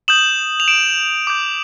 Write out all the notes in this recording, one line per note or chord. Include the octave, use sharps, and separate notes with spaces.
D#6 G6 E7 F#7
F7
D7 E7
D6 G6